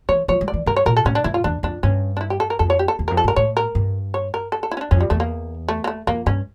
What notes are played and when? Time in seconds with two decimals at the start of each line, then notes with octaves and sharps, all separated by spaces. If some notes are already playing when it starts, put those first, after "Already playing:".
0.09 E3 C#5
0.28 F3 C#5
0.41 G3
0.48 D5
0.54 E3
0.66 G2 A#4
0.76 C#5
0.86 A#2 A#4
0.97 A4
1.05 A2 C#4
1.15 D4
1.24 G2 E4
1.34 F4
1.44 E2 D4
1.63 F2 D4
1.83 G2 C#4
2.17 D4
2.21 E4
2.30 G4
2.40 A4
2.50 A#4
2.59 F2 A4
2.70 C#5
2.79 G4
2.88 A4
2.99 E2
3.08 A#4
3.11 F2
3.17 A4
3.24 G2 A#4
3.36 A2 C#5
3.57 A#4
3.75 G2
4.14 C#5
4.34 A#4
4.52 A4
4.63 A4
4.71 E4
4.77 C#4
4.81 D4
4.91 F2 C#4
5.00 G3
5.10 E2 A3
5.20 A#3
5.68 A3
5.84 A#3
5.87 A3
6.07 F2 A#3
6.26 G2 C#4